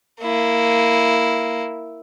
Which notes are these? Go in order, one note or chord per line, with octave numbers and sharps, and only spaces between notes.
A#3 E4